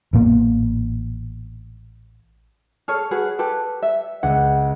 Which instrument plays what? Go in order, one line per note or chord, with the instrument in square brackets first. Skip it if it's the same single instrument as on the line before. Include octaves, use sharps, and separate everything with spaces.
[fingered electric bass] A1 A#2 A#3 B3
[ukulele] G#4 A4 C#5 [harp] F6 C#7
[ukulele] F#4 G#4 B4
G4 A4 B4
E5
[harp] C#2 [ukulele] F#5